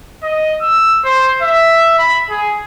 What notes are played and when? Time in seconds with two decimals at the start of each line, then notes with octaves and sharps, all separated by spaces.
0.23 D#5
0.61 E6
1.04 C5
1.42 E5
1.99 B5
2.30 G#4